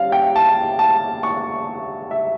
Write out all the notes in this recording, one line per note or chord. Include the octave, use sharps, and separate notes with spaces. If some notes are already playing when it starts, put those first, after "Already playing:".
Already playing: G3 C#4 F5
G5
A5
A5
C#6
E5